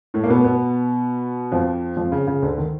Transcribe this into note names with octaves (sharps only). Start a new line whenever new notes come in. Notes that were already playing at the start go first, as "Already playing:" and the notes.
A2 A3
A#3
B2 B3
B2 B3
F2 F3
F2 F3
C#3
C#3
D2 D3
D#3